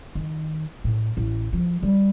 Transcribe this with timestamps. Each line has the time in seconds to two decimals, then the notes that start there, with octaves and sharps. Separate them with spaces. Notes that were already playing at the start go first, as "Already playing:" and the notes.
0.15 D#3
0.84 A2
1.17 A1
1.53 F3
1.83 G3